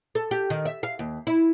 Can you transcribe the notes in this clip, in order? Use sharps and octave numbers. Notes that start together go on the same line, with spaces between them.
A4
G4
D#3
E5
F5
D#2
E4